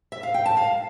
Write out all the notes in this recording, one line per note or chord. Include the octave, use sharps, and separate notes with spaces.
E5
F5
G5
A5
F5